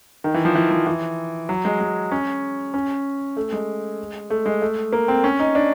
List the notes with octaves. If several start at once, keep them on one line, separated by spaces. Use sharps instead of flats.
D#3
E3
F3
E3
F3
E3
F#3
G#3
G#3
C#4
C#4
A3
G#3
A3
G#3
A3
A#3
C4
C#4
D#4
D4